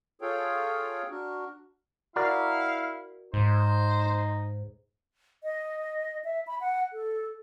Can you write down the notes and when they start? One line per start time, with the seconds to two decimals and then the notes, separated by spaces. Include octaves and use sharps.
0.22 F4 G#4 A4 C#5 F5 G5
1.10 D4 F#4 A#4
2.16 E4 F#4 A#4 D5 F5
3.33 G#2 D#4 C5
5.44 D#5
6.24 E5
6.47 B5
6.61 F#5
6.93 A4